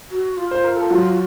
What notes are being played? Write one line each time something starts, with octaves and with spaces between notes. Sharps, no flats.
F#4
F4
C5
A#4
A4
F#3 F#4